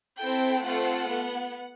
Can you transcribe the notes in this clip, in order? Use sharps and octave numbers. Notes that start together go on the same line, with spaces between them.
C4 E4 A4 G5
A3 C4 F4 A4 F#5
B3